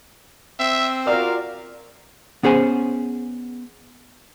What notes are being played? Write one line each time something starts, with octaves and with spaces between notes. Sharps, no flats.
C4 E5
F4 F#4 A#4 D5 F5
B3 C#4 G#4 C5 G#5